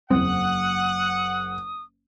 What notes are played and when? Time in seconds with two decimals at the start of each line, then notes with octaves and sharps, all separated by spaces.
0.10 F#1 E2 C4 F#5 D#6